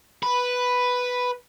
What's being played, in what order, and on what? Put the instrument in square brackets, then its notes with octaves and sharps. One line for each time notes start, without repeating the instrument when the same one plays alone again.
[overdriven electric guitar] B4